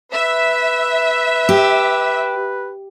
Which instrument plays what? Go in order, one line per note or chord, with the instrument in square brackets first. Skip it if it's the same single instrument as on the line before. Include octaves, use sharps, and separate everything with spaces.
[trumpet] B4 [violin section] E5
[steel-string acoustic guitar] G4